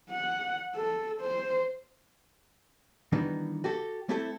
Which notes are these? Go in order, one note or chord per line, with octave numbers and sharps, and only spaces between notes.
F#5
A4
C5
D#3 E3 G3 B3 D4 D#4
F#4 G4 A4
A3 C4 E4 G4 A4